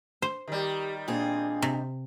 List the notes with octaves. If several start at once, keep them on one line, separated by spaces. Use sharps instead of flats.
C5
D#3 G3 G4
A#2 C4 D4 G#4
C3